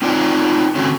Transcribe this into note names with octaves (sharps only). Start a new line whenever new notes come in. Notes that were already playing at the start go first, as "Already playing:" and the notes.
C4 D#4 F4 B4 D5 G#5
D3 C4 C#4 F#4